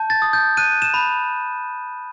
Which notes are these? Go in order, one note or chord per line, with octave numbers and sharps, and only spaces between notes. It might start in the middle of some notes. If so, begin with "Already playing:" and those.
Already playing: A5 G6
A6
D#6
G6
F#6 D#7
E7
B5